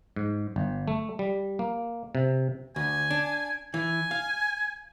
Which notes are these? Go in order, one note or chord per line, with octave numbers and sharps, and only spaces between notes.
G#2
G1
A3
G3
A#3
C3
D2 G#5
D4
E3 G#5
F5